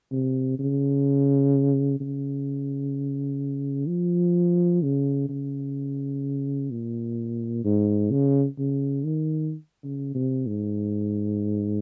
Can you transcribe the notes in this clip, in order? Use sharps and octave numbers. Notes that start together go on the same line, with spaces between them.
C3
C#3
C#3
F3
C#3
C#3
A#2
G#2
C#3
C#3
D#3
C#3
C3
G#2